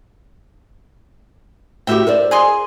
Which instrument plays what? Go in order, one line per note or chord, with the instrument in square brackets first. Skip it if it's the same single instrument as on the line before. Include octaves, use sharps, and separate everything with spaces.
[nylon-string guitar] A2 F#4 G4 [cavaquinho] E5 G5
[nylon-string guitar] A#4 C5 D5
[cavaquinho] G#4 D#5 C6